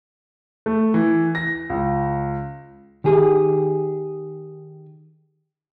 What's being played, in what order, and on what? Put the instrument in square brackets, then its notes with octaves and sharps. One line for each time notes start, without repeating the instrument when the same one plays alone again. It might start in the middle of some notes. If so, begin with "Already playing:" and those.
[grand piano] A3
E3
A#6
C#2
[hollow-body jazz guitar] D#3 G4 G#4